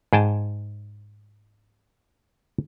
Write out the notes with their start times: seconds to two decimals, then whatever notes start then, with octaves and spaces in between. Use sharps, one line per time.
0.13 G#2 G#4 G5 A5